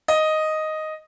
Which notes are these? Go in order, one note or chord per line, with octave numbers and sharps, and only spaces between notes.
D#5